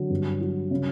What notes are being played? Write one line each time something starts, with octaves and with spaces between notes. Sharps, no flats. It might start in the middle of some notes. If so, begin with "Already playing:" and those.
Already playing: D3 F#3
G2
F#3
C#3